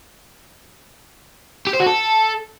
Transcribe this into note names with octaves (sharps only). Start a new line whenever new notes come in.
G4
C5
F#4
A4